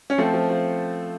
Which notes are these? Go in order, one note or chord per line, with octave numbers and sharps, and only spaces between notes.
C#4
F3 A3 C4
F3
F3